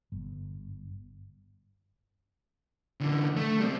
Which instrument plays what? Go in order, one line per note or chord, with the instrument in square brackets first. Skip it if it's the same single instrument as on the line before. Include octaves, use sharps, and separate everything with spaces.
[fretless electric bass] G1
[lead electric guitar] D3 E3
A3
G3 C4